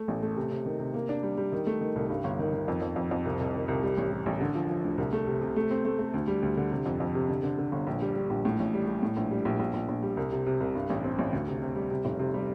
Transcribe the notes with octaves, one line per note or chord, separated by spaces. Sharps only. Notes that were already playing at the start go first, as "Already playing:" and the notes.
Already playing: A3
A1
A3
C3
C3
D#3
C3
A#3
D4
G3
G3
D#3
A3
D#3
C2
G2
G1
D#3
D#3
F2
F2
F2
F2
C2
C2
D#3
C2
G3
A1
G3
A1
D3
F3
F3
D2
C2
A3
C3
C3
A3
C4
A3
A3
D2
G3
D2
D3
C3
F2
F2
C3
D3
D3
D3
G1
A#1
G3
G3
A#1
A2
A1
G3
G3
A2
A#1
G3
A#1
A#1
A#1
A#1
G3
C2
C3
C3
C2
G2
A1
C4
A1
D2
C3
C3
G3
C3
F1
C3
G3